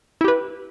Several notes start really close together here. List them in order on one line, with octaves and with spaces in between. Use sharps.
E4 G4 B4